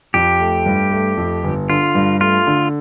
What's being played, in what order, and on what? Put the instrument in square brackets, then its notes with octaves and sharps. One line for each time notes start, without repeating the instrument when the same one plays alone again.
[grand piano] F2 [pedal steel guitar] G4
[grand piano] A3
G2
A3
F2
G1
[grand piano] D3 [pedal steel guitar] F4
[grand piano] G2
[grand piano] A3 [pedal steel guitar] F4
[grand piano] D3